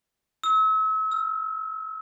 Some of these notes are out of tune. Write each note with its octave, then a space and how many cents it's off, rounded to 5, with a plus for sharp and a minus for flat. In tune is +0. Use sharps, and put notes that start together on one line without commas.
E6 -40
E6 +25